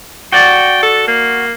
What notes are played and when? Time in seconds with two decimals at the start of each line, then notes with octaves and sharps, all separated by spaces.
0.32 F#4 D5 G5
0.83 A4
1.07 A#3